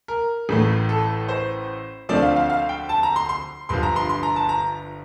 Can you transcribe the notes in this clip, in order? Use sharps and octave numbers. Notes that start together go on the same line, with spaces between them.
A#4
A1 A2 A3
A4
C5
D2 D3 F3 A3 C4 D5
F5
F5
F5
G5
A5
A#5
C6
C6
G1 G2 D3 F3 C6
A#5
C6
C6
A#5
A5
A#5